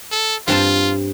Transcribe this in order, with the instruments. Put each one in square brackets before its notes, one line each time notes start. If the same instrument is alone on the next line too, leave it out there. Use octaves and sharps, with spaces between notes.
[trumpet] A4
[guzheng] G2 C4 A5 [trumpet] F4